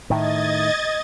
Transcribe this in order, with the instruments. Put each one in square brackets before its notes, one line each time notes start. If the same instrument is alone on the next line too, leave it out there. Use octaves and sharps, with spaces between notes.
[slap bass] A2 D#3 [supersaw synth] D#5 G#6 A6